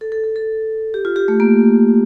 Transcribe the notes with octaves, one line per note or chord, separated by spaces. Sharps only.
A4
A4
A4
A4
G4
F4
G4
A3
A#3